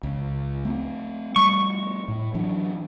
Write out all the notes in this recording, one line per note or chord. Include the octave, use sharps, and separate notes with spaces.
C#2
A3 A#3 C4
G3 A3 C#6
A2
E3 F#3 D4